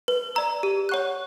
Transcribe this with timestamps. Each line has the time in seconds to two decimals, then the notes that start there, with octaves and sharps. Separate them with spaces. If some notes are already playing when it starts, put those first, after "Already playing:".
0.08 B4
0.35 D5 A#5 E6
0.63 G4
0.89 C#5 F#5 C#6 F#6